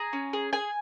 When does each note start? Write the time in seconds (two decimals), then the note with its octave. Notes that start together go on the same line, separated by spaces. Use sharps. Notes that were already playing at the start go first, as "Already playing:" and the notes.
Already playing: G#4 A#5
0.13 C#4
0.33 G#4
0.53 G#4 G#5